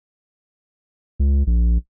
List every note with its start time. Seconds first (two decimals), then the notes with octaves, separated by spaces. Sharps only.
1.20 C#2
1.47 A#1